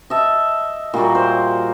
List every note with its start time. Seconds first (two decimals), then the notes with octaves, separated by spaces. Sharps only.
0.10 D#5 E5 A5
0.94 A#2 G3 A#3 F#4
1.15 A#4 C5